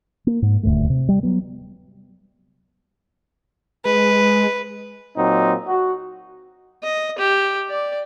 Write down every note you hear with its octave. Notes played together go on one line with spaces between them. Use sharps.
A#3
G#2
D#1 D2 G2 A3
C3
G3
F#3 B3
G#3 B4
A#2 F#3 C4 D#4
F#4
D#5
G4
D5